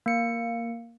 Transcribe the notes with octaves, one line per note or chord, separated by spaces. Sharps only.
A#3 C#7